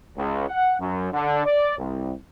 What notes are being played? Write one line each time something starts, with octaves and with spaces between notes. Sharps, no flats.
C#2
F#5
F#2
D3
D5
C2